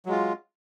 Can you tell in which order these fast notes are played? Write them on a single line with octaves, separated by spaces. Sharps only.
F#3 G#3 F4